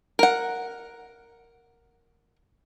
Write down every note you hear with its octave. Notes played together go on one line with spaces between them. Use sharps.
A#4 F#5